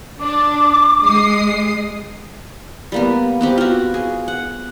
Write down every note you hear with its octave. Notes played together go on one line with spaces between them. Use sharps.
D4 D6
G#3 D#6 C7
G3 A#3 B3
B3 C4 G4
F4 F#4
G#4
F#5